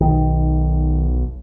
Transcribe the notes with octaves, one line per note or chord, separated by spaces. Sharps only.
B1 D#3